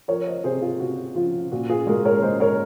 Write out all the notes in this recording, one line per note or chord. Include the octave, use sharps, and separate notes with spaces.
F3 A#4 C#5
C5 D#5
C3 G#4 C5
F4 G#4
C3 F#4
F3 F4
A#2 F#4
F4 G#4
G#3 F#4 A#4
A#4 C#5
G#3 C5 D#5
A#4 C#5